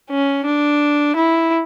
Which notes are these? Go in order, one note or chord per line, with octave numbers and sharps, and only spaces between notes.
C#4
D4
E4